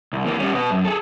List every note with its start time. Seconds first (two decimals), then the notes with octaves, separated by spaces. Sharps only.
0.13 C2
0.25 E3 A#3
0.40 G3 C#4
0.54 B2 B3
0.70 F#2
0.85 G#4 A4